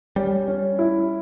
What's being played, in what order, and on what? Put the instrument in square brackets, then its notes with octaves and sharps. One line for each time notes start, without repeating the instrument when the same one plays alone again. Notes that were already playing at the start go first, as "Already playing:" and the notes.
[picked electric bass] G3 [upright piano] C#4
[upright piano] C#4
E4